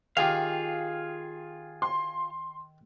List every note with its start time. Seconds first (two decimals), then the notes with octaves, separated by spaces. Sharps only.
0.17 D#3 F4 G4 G#4 F5
1.82 C6